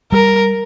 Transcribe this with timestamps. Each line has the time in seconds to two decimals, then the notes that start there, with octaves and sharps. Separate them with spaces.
0.12 G3 A#4